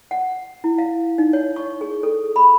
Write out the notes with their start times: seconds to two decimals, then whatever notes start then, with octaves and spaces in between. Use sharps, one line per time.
0.11 F#5
0.64 E4
0.78 F5
1.18 D#4
1.33 C#5
1.56 C#6
1.81 G#4
2.03 A4
2.36 B5